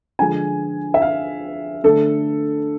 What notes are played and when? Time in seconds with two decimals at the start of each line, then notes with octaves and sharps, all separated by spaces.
0.19 D3 F3 G#3 G#5
0.94 E5
1.02 F5
1.84 D3 A3 A4